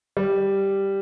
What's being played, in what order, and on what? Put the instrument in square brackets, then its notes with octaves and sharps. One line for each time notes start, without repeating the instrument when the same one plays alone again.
[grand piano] G3